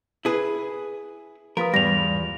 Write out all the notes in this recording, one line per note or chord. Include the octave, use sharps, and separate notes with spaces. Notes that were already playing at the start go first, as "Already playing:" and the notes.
E4 G#4 B4
F3 F4 A#4 B4 D#6
E2 G#2 G3 A#6 F7